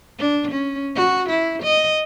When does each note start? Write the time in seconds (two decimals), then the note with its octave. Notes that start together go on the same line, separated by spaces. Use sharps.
0.19 D4
0.51 C#4
0.95 F#4
1.29 E4
1.63 D#5